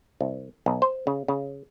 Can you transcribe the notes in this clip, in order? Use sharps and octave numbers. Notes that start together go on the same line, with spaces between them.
C2
B1
C5
C#3
C#3